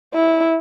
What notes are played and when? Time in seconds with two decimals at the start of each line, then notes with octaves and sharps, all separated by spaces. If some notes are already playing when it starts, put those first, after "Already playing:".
0.14 E4